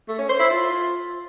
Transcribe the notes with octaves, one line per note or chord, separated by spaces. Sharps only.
A3
C#4
C5
E4
F4